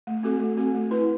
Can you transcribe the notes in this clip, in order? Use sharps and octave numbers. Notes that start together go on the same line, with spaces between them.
A3
C4 F#4 A4
A3
C4 F#4 A4
A3
E4 B4